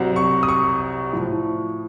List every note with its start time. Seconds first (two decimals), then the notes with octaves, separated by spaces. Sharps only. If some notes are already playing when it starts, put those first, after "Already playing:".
Already playing: C2 C3 F#3
0.16 C#6
0.43 D#6
0.49 C#6
1.13 A2 F3